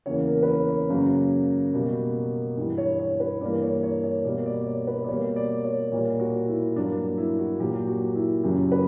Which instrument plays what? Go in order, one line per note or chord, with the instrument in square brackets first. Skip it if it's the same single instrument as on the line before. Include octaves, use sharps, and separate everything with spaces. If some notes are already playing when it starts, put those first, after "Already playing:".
[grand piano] E2 C#3 E3 A#3 C#5
A#4
B4
C#5
C#5
F#2 C#3 F#3 A#3
B2 G3 A#3
G2 E3 G3
C#5
C#5
B4
G2 E3 G3 A#3 D5
C#5
C#5
C#5
B2 G3 A#3 D5
D5
C#5
B4
D5
B2 G3 A#3 C#5
D5
C#5
A#2 G3 A#3 C#5
F#4
E4
G2 F#3 A#3 D4
D4
E4
F#4
A#2 F#3 A#3 G4
F#4
E4
F#2 C#3 F#3 G4
B4